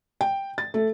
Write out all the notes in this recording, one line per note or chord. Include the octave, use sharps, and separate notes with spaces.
G5
A6
A3